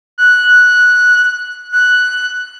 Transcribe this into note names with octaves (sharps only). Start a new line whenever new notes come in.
F#6
F#6